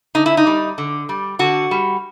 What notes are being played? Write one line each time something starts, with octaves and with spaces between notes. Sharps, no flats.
D3 D#4
E4
D#4
G3
D3
G3
D3 F#4
G3